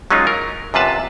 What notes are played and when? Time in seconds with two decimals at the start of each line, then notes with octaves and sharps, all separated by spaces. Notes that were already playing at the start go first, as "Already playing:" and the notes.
0.11 F#3 G#3 C#4 D#4 F4
0.27 A#4
0.74 F#2 C3 F4 B4 A5